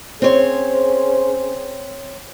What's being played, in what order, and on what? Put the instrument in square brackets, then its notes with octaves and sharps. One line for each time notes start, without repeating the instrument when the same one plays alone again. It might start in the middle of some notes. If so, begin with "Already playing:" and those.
[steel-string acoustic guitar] C4 C#5 [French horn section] C#4 G#4 C5